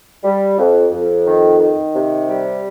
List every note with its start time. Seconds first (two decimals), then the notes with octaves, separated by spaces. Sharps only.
0.24 G3
0.58 F2
0.92 F2
1.27 D#3
1.60 D#3
1.95 C3
2.29 G3